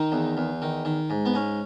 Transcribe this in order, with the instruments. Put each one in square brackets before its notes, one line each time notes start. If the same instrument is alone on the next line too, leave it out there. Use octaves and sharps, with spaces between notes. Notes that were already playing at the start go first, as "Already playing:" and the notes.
Already playing: [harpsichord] D#3 D#4
E2
E2
D#3
D#3
G#2
B3
G#2 C#4